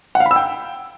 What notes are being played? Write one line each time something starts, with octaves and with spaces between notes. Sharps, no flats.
F#5
F5
B5
E6
G5